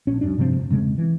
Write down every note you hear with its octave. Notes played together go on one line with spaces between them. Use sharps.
A#1 C#4
C#2 F#2 D4
G2 C3 F3 C4
F1
E1 C#3 G#3 C4
E3